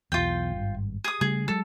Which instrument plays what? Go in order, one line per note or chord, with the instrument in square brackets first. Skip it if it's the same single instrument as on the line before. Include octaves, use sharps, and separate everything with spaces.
[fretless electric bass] B1 E2 [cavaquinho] F4 G5
[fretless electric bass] G#1 G2
[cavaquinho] G#4 D#6
[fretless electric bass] C#3 G3 A3 [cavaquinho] G#4
[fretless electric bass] F#3 G#3 [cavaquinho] A4